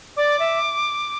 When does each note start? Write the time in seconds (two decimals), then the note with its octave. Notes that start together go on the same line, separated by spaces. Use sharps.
0.17 D5 D6
0.40 E5